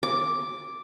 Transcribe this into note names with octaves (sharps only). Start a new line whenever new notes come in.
D6